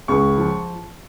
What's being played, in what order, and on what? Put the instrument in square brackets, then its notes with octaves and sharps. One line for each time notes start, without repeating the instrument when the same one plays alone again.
[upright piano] C#2 C#6
F3